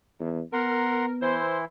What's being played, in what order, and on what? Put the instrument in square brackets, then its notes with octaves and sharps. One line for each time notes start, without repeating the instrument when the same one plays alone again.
[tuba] E2
[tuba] B3 [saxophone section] A#4 [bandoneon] F#5 A#5 C6
[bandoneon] E3 E4 [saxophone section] C5